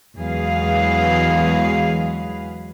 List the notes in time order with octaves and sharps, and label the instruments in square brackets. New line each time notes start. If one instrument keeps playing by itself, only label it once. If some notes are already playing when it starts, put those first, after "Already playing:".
[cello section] E2 F#3 G#3 G#4 B4 F5